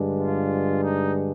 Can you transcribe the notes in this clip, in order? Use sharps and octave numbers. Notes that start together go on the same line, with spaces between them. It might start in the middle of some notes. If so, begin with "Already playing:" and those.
Already playing: G2 D3 G#3 D4
F4
D#4